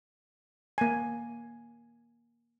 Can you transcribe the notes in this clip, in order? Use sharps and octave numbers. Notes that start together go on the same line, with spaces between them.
A#3 G#5